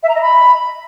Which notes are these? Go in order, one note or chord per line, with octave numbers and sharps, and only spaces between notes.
E5
A#5
D#5
B5